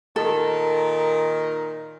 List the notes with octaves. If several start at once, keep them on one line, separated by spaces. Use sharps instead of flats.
A#2 D#3 A4